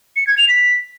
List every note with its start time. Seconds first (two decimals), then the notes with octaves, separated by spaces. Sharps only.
0.16 C#7
0.27 G#6
0.38 F7
0.49 B6